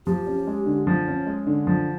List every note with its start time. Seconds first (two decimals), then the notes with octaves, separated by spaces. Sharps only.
0.06 F3 G4
0.27 C#4
0.47 G#3
0.66 D3
0.87 F3
1.08 C#4
1.26 G#3
1.47 D3
1.67 F3